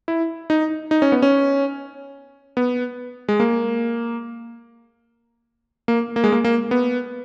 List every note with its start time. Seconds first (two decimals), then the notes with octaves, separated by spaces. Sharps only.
0.08 E4
0.50 D#4
0.91 D#4
1.02 C#4
1.12 B3
1.22 C#4
2.57 B3
3.29 G#3
3.40 A#3
5.88 A#3
6.16 A#3
6.24 G#3
6.32 A#3
6.44 A#3
6.71 B3